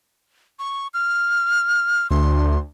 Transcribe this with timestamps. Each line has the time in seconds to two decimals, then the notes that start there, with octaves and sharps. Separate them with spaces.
0.59 C#6
0.94 F6
2.11 D2 C6